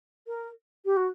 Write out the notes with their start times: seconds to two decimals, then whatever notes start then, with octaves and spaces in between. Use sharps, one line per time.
0.27 A#4
0.85 G4
0.97 F#4